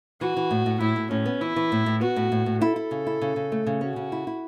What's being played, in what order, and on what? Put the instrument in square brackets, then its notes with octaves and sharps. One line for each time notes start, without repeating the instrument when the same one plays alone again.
[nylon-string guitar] E3 [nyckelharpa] F#4
[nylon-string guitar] E3
A2
A2
[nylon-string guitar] A2 [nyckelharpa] E4
[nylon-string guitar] A2
[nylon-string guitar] A2 [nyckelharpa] C#4
[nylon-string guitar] B3
[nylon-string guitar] E3 [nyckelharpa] E4
[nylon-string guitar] E3
A2
A2
[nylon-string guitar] B3 [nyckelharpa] F#4
[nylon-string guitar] A2
A2
A2
[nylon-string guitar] E4 [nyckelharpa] A4
[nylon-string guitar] E4
C#3
E4
C#3
C#3
A3
C#3
[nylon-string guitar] C#4 [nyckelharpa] F#4
[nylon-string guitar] C#3
E4
E4